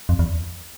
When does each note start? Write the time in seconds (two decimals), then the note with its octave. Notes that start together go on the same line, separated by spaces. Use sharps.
0.09 F2
0.19 E2